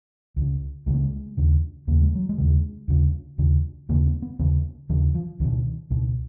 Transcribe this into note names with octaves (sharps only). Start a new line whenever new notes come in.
C#2 C#3
C#2 C#3 G#3 A#3
G#3
D#2 C#3
D#2 C#3 A#3
G#3
F#3
G#3
D#2 C#3
D#2 C#3
D#2 C#3
D#2 C#3 A#3
B3
B3
D#2 C#3 B3
D#2 C#3 F3
F3
C#2 B2 D#3
C#2 B2